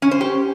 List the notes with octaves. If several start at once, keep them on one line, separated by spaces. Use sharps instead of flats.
C#4
C5
G4